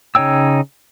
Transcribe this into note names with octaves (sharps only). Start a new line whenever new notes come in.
C#3 D#4 C#5 G5 E6